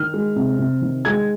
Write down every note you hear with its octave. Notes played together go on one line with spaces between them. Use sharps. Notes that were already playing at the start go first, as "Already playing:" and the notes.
Already playing: D#3 F6
G#3
C3
C3
D#3
G#3 G#6